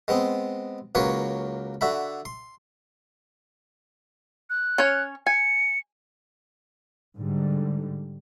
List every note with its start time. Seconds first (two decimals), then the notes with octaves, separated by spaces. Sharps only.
0.08 G#3 B3 C4
0.95 C#2 F#3 A#3 B4 C#5
1.81 D3 F#4 E5 B5
2.25 C6
4.50 F#6
4.78 C#4 C#5
5.27 G#5 C#7
7.17 G#2 D3 G3